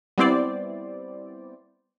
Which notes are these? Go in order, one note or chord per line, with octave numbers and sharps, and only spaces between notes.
G3 B3 C4 E4 C5 D5